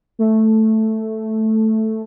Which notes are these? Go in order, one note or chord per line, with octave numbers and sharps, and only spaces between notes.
A3